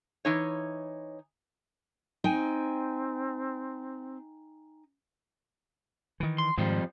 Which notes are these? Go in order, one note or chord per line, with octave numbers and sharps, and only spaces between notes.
E3 D#4 C#5
C4 D#4 G5 G#5
D#3 E3
C6
F2 G#2 D#3 F3 G3